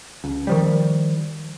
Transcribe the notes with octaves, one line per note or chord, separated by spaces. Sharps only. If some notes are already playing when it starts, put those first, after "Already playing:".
C#2
D#3 F3 G3